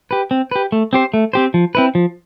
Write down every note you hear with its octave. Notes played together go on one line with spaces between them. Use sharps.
G4 B4
C4
G4 B4
A3
C4 G4 C5
A3
C4 G4 C5
F3
C4 E4 B4
F3